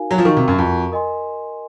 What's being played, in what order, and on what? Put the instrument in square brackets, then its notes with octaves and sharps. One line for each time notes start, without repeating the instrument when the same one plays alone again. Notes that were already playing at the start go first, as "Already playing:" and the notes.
Already playing: [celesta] D#4 F#4 A#4 F5 G#5
[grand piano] F#3
F3
[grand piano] D#3 [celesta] F#4 A#4 F5 A#5 C#6
[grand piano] C3
F#2
F2
[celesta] A#4 D#5 G#5 C6